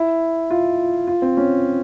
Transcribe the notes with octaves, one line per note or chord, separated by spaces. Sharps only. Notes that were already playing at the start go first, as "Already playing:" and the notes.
Already playing: E4
F4
F4
C4
C#4